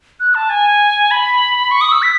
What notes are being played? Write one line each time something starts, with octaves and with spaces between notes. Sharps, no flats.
F#6
A5
G#5
B5
C#6
D#6
E6
B6